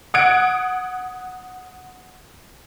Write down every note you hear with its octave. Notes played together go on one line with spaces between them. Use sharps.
F#5 D#6 F#6 G#6 C#7 D7